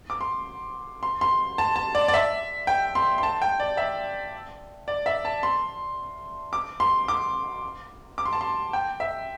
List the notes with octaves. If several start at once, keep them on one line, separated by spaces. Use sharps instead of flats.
D6
C6
C6
C6
A5
A5
D5
D5
E5
G5
C6
C6
A5
G5
D5
E5
D5
E5
A5
C6
D6
C6
D6
D6
C6
A5
C6
G5
E5